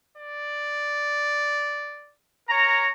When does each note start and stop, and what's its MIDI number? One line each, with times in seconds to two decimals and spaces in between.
0.18 2.14 74
2.49 2.89 70
2.49 2.88 73
2.49 2.88 82